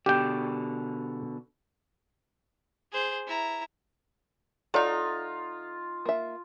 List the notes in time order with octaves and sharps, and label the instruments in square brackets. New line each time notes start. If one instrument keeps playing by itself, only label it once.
[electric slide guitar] B2 D3 [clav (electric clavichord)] G4 G5
[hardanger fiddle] G#4 C5
E4 A#5
[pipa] F#3 D#4 [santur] F4 [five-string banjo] A4 D5 E5
[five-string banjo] A#3 E5